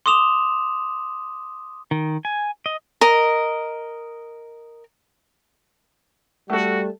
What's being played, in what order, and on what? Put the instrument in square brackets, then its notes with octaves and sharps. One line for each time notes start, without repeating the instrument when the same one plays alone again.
[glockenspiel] C6 D6 D#6 E7 F7
[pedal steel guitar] D#3
G#5
D#5
[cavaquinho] A#4 D#5
[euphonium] G3 [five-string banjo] A3 A4 [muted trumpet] F#4